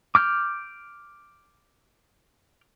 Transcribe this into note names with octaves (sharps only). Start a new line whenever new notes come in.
D6 F6 G6